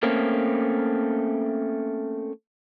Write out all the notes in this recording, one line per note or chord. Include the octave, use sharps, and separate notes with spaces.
A3 A#3 C4 C#4